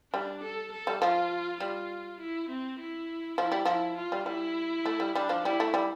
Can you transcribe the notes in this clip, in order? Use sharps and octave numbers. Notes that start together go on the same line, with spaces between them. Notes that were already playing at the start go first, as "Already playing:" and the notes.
G3 D4
A4
A4
G3
F3 F4
G3 F4
E4
C4
E4
F3 E4
G3
F3 E4
F4
G3
G3 E4
A3
G3
G3 D4
F3
G3 E4
A3
G3